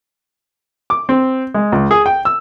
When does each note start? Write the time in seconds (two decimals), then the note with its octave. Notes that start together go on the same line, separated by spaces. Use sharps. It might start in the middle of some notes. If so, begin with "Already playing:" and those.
0.90 D6
1.09 C4
1.54 G#3
1.72 C#2
1.91 G#4
2.06 G5
2.25 E6